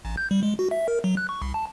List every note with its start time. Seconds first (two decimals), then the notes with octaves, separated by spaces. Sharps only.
0.05 A1
0.17 G6
0.31 G3
0.43 G#3
0.59 F#4
0.71 E5
0.88 A#4
1.04 F#3
1.17 F#6
1.29 C#6
1.42 C2
1.54 A5